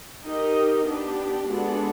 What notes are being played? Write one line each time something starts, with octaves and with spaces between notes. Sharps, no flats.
D#4 G4 A#4 D#5
B3 D4 G4
G#3 B3 D4 F#4 A4